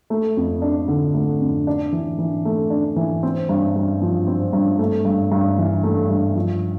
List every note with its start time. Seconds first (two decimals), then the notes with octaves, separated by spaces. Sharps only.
0.10 A3
0.37 F2
0.62 D4
0.88 D3
1.14 A3
1.41 F2
1.67 D4
1.92 E3
2.19 E3
2.45 A3
2.70 D4
2.96 E3
3.23 C4
3.49 G2
3.76 G2
4.02 F3
4.27 C4
4.53 G2
4.79 A3
5.05 G2
5.32 G2
5.58 E3
5.83 A3
6.09 G2
6.35 F3